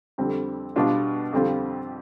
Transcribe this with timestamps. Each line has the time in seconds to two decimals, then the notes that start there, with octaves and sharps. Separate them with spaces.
0.18 F2 D3 G3 C4
0.76 B2 G3 D4 F4
1.32 F2 D3 G3 C4 F4